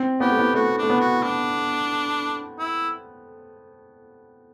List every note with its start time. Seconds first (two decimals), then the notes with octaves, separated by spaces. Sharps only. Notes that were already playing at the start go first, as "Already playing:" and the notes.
Already playing: C4
0.20 B3 G4
0.29 A3
0.39 B3
0.54 A3 F#4
0.78 A3 D4
0.89 B3
1.00 F#4
1.23 D4
2.59 E4